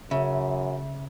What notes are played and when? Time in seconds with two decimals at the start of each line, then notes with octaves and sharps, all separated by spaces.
0.11 F#2 C#3 E5